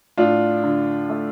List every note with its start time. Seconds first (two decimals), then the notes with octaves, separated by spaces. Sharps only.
0.17 A2 D4 F4
0.64 D3
1.09 A3